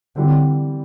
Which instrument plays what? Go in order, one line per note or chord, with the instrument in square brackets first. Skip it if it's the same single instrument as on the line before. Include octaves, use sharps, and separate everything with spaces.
[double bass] D3 [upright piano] E3 G3 C4